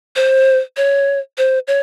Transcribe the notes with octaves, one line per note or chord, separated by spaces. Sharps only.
C5
C#5
C5
C#5